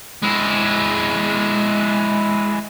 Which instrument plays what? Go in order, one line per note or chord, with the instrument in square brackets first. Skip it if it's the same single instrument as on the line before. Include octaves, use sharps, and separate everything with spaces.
[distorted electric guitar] G#3 E4